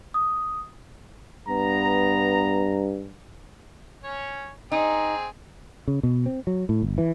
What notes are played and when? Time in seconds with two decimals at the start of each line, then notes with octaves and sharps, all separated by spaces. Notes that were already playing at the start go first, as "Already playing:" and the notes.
0.14 D#6
1.48 G2 B3 A#5
4.04 C#4 C#5
4.72 C4 D#4 G#4
5.88 C#3
6.03 B2
6.26 C4
6.47 F#3
6.69 A2
6.82 G1
6.98 E3